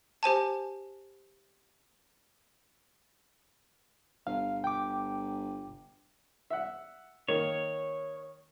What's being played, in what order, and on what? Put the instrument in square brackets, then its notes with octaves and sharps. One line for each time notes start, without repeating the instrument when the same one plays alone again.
[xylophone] G4 C5 G#5 A5
[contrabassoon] G1 [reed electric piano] F5
[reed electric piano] G5 D6
[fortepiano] E5 F#5
[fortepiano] D#3 A#3 [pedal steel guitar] C#5